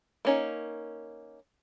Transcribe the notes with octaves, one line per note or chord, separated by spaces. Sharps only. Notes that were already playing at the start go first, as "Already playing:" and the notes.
A#3 C#4 D#4